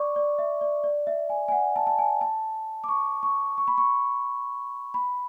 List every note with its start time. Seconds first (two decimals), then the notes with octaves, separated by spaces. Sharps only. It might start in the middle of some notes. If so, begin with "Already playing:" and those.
Already playing: D5 C#6 D6
0.16 D5
0.39 E5
0.61 D5
0.84 D5
1.07 E5
1.30 G#5
1.48 G#5
1.52 F#5
1.76 A5
1.87 A5
1.99 G#5
2.21 A5
2.84 D6
2.89 C#6
3.23 C#6
3.58 C#6
3.68 B5
3.78 C#6
4.94 B5